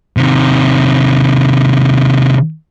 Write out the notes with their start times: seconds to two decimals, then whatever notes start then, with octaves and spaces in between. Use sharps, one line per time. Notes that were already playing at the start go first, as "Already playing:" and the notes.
0.17 C3 D#3